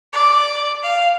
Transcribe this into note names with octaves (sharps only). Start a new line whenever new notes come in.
D5
F5